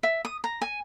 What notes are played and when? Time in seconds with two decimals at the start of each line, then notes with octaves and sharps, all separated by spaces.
0.03 E5
0.25 D#6
0.44 A#5
0.62 G#5